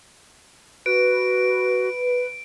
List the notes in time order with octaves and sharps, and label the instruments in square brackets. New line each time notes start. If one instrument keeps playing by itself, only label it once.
[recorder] F#4 [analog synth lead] B4 [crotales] D7